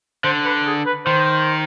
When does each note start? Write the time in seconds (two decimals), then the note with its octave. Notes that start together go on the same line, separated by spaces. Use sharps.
0.24 D3 C5
0.45 B4
0.66 G#4
0.86 B4
1.06 D#3 C5